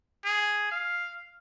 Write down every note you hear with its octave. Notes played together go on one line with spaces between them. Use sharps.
G#4
F5